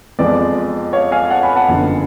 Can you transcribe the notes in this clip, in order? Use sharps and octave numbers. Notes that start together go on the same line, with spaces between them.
F2 F3 G#3 B3 D5
C#5 F5
F5 G#5
F#5 A5
G#5 B5
F#5 A5
F#1 F#2 D3 F3 B3